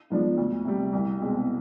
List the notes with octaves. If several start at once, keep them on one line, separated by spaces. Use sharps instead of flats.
G#2 F3 B3 D4
D2
C3 G3
C2
B2 G#3 C4